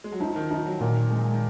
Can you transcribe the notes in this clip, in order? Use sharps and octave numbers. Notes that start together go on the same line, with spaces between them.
G#3
F#3
F3 D#4
D#3
F3 D#4
F#3
A#2 D#3
G#3
D#3